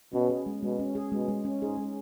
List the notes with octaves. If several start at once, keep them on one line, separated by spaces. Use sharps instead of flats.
B2 C#4
G#4
G#3
B2 G#3
C#4
G#4
B2 G#3
G#3
C#4
G#2 G#4
G#3